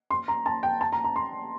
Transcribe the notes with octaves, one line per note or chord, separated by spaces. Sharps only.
C6
A#5
A5
G5
A5
A#5
A#5
C6